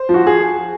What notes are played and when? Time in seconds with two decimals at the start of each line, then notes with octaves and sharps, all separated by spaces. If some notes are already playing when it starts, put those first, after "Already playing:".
Already playing: C5
0.09 F3
0.14 F#4
0.24 F3 G#4